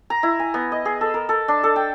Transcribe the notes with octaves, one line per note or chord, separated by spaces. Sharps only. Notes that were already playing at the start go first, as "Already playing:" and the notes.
A#5
E4
G#5
B3
D#5
G#4
A4
A#4
A4
D4
A4
G5